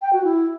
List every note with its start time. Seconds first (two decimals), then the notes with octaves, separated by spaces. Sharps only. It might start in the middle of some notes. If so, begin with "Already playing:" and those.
0.02 G5
0.13 F#4
0.24 E4